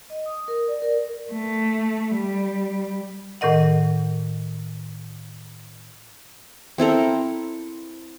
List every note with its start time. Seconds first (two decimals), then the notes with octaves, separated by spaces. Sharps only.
0.10 D#5
0.26 D#6
0.48 A#4
0.68 D5
0.82 A#4
1.32 A3
2.15 G3
3.41 A2 D#3 A#4 D#5 F#5
6.78 C4 E4 A4 A#4